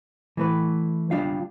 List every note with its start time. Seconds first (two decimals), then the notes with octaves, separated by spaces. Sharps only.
0.37 E3 A3 B4
1.11 G3 D4 F4 F5